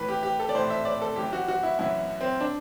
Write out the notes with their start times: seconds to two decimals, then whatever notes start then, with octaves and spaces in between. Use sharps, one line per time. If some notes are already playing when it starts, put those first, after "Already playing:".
Already playing: A2 E3 B4
0.08 G4
0.23 G4
0.40 A4
0.49 D5
0.55 A2 E3 C5
0.70 E5
0.85 D5
1.02 A4
1.16 F#2 E3 G4
1.33 F#4
1.48 F#4
1.63 E4
1.79 F#2 E3 E4
2.21 C4
2.40 D4